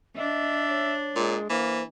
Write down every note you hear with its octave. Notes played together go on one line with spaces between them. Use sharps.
D4 D#5 E5
C#5
A#2 G#3
E3 A#3 C5